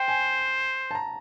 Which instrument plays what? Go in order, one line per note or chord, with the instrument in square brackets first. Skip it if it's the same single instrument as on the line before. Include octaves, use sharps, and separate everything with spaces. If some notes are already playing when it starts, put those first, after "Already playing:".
Already playing: [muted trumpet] C5 [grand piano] G5
[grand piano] G#5
A5
A#5